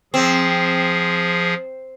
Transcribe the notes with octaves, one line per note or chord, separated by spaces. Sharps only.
F3 C4 G#4